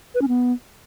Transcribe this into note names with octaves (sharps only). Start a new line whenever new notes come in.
B4
C#4
B3